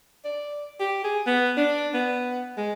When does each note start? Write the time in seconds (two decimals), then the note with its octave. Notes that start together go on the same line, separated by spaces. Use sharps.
0.25 D5
0.80 G4
1.04 G#4
1.27 B3
1.57 D4
1.94 B3
2.57 G#3